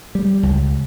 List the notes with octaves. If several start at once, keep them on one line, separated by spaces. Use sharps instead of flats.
G3
C#2